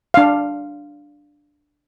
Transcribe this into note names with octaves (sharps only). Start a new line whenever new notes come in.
D4 F5